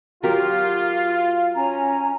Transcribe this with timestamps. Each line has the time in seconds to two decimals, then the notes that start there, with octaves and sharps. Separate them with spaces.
0.24 F#3 F4 G4 A#4
1.55 C#4 G#5 A#5